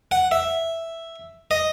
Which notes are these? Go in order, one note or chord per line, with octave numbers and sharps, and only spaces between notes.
F#5
E5
D#5